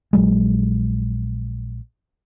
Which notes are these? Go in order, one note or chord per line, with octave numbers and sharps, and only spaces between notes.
A#1 F#3 G#3